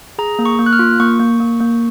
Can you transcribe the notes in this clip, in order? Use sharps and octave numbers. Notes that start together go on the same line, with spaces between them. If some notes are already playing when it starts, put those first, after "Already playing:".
G#4 A#5
A#3
C#6
A#3
F#6
F6
F4
A#3 C#6
A#3
A#3
A#3